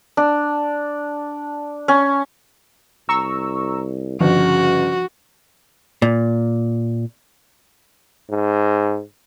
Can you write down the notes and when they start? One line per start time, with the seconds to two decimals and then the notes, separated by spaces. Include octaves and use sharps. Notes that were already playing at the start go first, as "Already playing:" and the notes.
0.17 D4
1.88 C#4
3.09 C2 A#5 C#6 E6
4.20 G1 C#3 F3 F#4
6.02 A#2
8.30 G#2